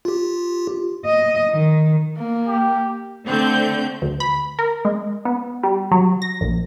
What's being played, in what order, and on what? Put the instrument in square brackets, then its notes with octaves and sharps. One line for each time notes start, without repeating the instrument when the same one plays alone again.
[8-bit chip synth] F4 G4
[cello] D#5
D#3
[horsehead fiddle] A#3
[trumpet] G4
[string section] D3 A3 C4 G6
[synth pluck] D2
B5
A#4
G#3
B3
G3
F#3
A#6
A#1